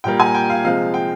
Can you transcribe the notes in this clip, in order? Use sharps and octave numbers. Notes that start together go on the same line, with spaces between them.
A#2 G3 A#3 G5
G#5
G5
F5
C3 F3 G#3 F5
G5